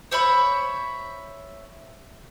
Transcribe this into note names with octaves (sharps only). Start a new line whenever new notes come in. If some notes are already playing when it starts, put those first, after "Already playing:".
C5 C#5 E5 B5